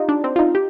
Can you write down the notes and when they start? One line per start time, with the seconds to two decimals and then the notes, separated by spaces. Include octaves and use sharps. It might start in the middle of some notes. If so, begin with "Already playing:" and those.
Already playing: D#4 F4 G4
0.09 D4
0.24 C4
0.36 F4
0.39 D#4
0.55 G4